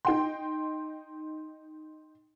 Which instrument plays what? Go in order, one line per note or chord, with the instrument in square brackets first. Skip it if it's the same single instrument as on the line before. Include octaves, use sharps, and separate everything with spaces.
[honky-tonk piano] D#4 G5 C6